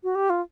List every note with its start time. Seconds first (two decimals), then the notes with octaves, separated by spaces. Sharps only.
0.04 F#4
0.15 G4
0.30 F4